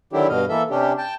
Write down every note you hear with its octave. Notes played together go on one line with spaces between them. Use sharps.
D3 D#3 F#3 D4 E4 G4
G2 B2 D#5 F5
E3 A#3 A4 E5
C3 C#4 D4 G4
G5 A5